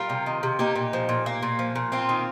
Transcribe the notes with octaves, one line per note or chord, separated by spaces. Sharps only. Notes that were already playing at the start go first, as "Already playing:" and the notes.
Already playing: G3 F4 A#4
C3
D#3
C3
A#3 D#4 G4
A#2
F3
A#2
A#3
A#2
F3
A#2
A#3 C4 F4
D#3